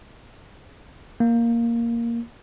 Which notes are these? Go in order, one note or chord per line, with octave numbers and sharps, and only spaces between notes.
A#3